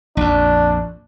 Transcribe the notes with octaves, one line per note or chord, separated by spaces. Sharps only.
A#1 F2 D4